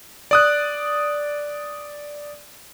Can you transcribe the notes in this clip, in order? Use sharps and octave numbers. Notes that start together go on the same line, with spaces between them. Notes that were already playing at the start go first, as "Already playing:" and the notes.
D5 D#6 F#6